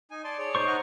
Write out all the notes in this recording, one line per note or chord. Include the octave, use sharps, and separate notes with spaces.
D#4 G#5
D5 A5 C6
G#4 C#5 D5
D#4 C5 C#6
F#5 A#5 F6